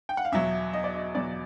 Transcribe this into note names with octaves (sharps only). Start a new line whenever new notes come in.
G5
F#5
F5
E2 B2 F#3 E5
D#5
D5
D#5
E2 B2 F#3 D5